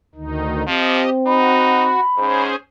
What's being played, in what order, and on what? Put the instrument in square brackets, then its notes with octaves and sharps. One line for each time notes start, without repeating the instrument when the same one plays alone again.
[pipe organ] D2 D#3 D#4
[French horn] F3 [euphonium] C4 [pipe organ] G4 D#5
[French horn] D#4 [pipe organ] F#4 [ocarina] B5
[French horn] G#2 [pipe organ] C#4 G#4 C5